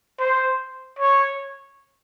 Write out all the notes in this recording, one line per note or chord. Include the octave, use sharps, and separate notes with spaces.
C5
C#5